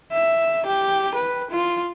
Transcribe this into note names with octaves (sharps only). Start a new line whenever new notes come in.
E5
G4
B4
F4